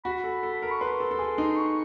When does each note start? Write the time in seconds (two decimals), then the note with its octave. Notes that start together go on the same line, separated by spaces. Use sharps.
0.05 F#4 B5
0.24 A4
0.43 A4
0.62 A#4
0.71 C#6
0.81 B4 C6
1.00 A4
1.11 A4
1.19 G#4
1.38 D#4
1.57 C#6